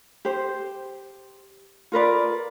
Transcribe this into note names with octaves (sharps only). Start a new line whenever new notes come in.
G4 C5
F4 A#4 B4 D5